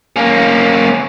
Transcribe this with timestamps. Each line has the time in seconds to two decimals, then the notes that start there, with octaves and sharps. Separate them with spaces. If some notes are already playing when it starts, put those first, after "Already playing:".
0.16 A#3 C#4